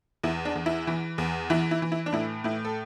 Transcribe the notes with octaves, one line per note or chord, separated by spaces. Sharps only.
E2 E4
D4
E2
E4
E3
E2
E3 E4
E4
E3
E4
D4
A2 E4
A2 E4
A4